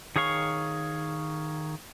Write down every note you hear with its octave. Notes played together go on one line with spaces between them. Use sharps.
D#3 G#4 C#5 F5 C#6